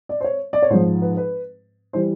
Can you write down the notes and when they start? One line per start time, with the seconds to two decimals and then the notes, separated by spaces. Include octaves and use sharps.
0.09 D5
0.21 C5
0.24 C#5
0.53 D5
0.62 C#5
0.70 G#2 F3 C5
1.02 B4
1.17 B4
1.93 E3 G3 C5